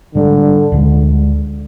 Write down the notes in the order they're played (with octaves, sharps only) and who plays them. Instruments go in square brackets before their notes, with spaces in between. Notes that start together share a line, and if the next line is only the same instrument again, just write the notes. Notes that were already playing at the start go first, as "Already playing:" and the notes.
[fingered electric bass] G#2 G3 D4 [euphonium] D3
[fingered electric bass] D2 D3 F3 G#3